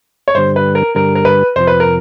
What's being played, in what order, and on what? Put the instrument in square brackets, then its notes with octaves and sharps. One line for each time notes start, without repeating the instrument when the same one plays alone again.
[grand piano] C#5
[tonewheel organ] G2 D3 G3 [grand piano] C5
[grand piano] B4
A#4
[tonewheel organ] G2 D3 G3 [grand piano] A#4
[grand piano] A#4
B4
[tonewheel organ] F2 C3 F3 [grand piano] C5
[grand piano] B4
A#4